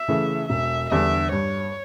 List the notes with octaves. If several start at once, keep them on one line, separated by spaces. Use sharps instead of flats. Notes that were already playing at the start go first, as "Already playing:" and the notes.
Already playing: E5
C#3 E3 A3
E1 E5
E2 D3 G3 D4 E5
G2 C#5